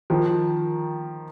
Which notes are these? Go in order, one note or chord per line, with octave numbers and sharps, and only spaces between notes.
D#3 F3